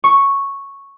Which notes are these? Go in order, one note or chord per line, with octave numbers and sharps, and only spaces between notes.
C#6